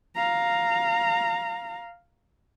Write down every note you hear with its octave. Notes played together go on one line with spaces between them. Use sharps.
F5 A#5